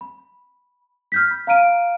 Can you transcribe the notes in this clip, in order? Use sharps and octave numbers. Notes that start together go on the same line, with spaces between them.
B5
F6 G6 B6
B5
F5 A#5 F6 D7 D#7